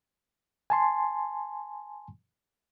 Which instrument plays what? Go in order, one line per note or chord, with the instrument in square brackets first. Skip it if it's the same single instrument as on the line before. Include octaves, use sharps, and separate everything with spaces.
[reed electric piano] G#5 A5 C6